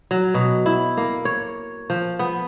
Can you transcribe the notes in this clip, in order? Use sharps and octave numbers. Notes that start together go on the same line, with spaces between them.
F#3
B2
E4
A#3
C#5
F3
B3